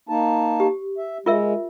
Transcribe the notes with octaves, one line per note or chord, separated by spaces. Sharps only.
A#3 D#4 A5
G4
E5
G#3 F4 A#4 E5